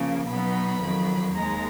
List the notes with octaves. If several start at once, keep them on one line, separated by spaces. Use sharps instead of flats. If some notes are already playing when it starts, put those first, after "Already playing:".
Already playing: C#3 F3 A#3
B2 F#3 B3 D#4 B5
F2 D#3 F#3
D#2 D#3 G#3 A#5